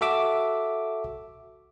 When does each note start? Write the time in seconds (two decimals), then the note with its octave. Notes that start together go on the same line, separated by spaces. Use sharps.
0.01 F#4 A4 E5 D6 E6